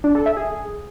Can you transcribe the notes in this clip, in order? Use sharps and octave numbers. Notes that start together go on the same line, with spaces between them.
D4
A4
E5
G#4